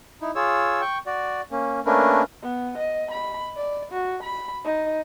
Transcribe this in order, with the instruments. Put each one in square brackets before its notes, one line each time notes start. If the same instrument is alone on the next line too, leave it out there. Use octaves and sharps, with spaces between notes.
[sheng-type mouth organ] D#4 E4
F4 G#4 C#5 E6
G5 C#6
F#4 D5
A#3 C#4
A3 A#3 C#4 D4 A#4 B4
[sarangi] B3
D#5
B5
D5
F#4
B5
D#4